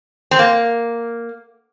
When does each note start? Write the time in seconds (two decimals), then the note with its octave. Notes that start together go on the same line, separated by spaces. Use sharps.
0.31 C4
0.39 A#3